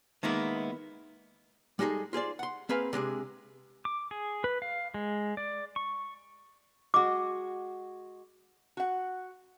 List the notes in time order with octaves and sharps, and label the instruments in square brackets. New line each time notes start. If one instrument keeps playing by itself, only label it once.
[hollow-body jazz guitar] D#3 G#3 A#3 B3 E4
G3 G#3 D#4 F#4 G#4 A4
F4 G#4 C5 D5
F#5 C6
A#3 C4 G#4 B4 F5
C3 G#3 D4 G#4
[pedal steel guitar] D6
G#4
B4
F5
G#3
D5
C#6
[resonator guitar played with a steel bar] G#3 F#4 [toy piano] D6
[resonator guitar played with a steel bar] F#4 F#5